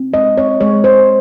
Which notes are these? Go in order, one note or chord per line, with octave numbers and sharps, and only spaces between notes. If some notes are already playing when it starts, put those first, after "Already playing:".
Already playing: C4
G#3 D#5
C4 C#5
G#3 C#5
G#3 C5